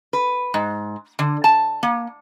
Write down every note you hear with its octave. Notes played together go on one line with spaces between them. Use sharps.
B4
G#2
D3
A5
A#3